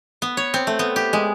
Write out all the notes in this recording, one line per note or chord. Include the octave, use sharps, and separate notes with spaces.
B3
C#5
C4
A3
B3
G4
G#3